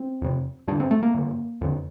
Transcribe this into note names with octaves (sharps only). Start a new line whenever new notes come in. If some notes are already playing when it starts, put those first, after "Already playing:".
Already playing: C4
F2 C3
G2 D3 D4
C4
A3
A#3
G2 D3
F2 D3